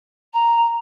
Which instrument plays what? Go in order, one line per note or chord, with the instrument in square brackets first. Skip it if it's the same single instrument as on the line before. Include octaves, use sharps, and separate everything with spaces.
[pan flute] A#5